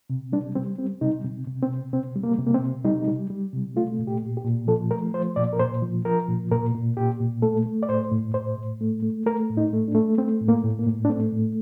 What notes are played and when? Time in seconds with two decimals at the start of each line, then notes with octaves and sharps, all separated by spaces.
0.10 C3
0.32 G3 D4
0.55 G3 C4
0.78 G3 C4
1.01 C3 D#4
1.24 C3
1.47 C3
1.63 C4
1.70 C3
1.93 C3 C4
2.16 G3
2.23 A#3
2.39 C3
2.47 A#3
2.54 C4
2.62 C3
2.84 G3 D#4
3.07 G3
3.30 G3
3.53 C3
3.76 A3 F4
3.99 A#2
4.07 G4
4.22 A#2
4.37 G4
4.45 A#2
4.68 F3 A4
4.91 A3 A#4
5.14 F3 C5
5.36 A#2 D5
5.53 A#4
5.59 A#2 C5
5.82 F3
6.05 F3 A#4
6.28 A#2
6.51 A#2 A#4
6.74 A#2
6.97 A#2 G4
7.20 A#2
7.42 A3 A4
7.66 A3
7.83 D5
7.89 A2 C5
8.12 A2
8.34 A2 C5
8.58 A2
8.81 A3
9.03 A3
9.26 A3 A#4
9.49 A2
9.57 D#4
9.73 A3
9.88 D4
9.95 A3
10.18 A3 C4
10.41 A2
10.48 A#3
10.64 A2
10.79 A#3
10.86 A2
11.05 D4
11.09 A3 C4
11.33 A2